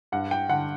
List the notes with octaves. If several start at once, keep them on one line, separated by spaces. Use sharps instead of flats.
G2 F#5
G5
D3 F#5